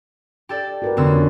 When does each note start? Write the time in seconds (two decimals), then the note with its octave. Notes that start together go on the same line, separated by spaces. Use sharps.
0.49 G4 A4 D5
0.82 F#4 A#4 B4
0.97 F2 D3 B3 C#4 E6